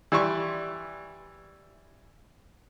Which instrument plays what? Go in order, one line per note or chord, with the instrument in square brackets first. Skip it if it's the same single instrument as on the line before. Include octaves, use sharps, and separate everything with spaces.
[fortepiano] E3 G3 D5 E5 C6 C#6